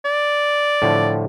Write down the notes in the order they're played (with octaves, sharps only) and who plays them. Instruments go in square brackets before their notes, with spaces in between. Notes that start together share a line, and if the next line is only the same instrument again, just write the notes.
[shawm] D5
[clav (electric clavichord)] A2 D3 F3